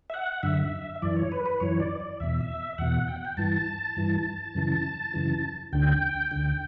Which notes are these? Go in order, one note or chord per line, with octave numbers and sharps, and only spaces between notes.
E5
F#5
F#2 D3 E5
F#2 E3 D5
C#5
B4
B4
F#2 E3 C#5
D5
D5
E2 B2 E5
E2 B2 F#5
G5
F#5
G5
G2 E3 A5
G2 E3
F#2 C#3 E3
F#2 C#3 E3
D2 D3 G5
D2 D3